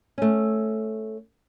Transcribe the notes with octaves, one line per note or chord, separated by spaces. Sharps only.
A3 C#4